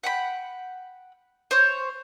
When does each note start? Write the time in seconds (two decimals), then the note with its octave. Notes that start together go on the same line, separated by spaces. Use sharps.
0.03 F#5 G5 B5
1.51 C5 C#5